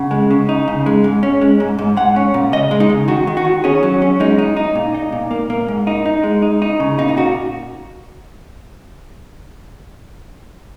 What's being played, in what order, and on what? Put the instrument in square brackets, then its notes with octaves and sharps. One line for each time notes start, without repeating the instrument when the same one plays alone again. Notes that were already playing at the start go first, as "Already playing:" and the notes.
Already playing: [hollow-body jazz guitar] C#3 F#5
G#3
C#3
D#4
C#3
G#3
G#2
C#4
G#3
G#2
G#2
G#3 F#5
C#4
A#2
C#3 D#5
G#3
D#4
C#3
D#3 F#4
D#3
F#4
D#3
C#4 G#4
F#3
C#4
G#3 D#4
D#4
D#4
A#2
D#4
A#2
A#3
A#3
G#2
D#4
D#4
G#3
D#4
D#4
C#3
A#2 D#4
D#4
A#2 F#4